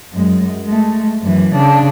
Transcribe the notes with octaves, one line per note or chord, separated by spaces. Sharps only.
F#2 G#3
G#3 A3
F#2 E3
C#3 D4